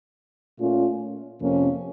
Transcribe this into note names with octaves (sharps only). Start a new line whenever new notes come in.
A#2 A3 C#4 F4
F2 C3 F3 A#3 C#4